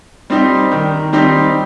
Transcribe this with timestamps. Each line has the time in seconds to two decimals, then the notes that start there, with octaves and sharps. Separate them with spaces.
0.30 G3 C4 D#4 G4
0.72 D#3
1.13 G3 C4 D#4 G4